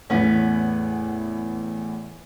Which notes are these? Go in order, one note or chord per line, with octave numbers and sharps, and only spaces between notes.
E2 A2 B3 C#4